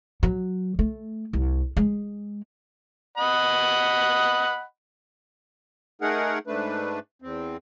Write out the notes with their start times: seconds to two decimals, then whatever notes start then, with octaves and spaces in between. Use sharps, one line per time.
0.23 F#3
0.79 A3
1.33 C2
1.77 G#3
3.17 D#5 F#5 B5
6.02 A3 D#4 G#4 A#4 F#5
6.47 G#2 A3 D4 B4
7.22 E2 C4